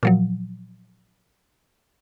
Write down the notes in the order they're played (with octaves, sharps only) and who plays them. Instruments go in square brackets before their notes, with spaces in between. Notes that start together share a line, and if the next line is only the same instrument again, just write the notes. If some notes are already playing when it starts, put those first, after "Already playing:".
[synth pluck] A#2 F3 F#3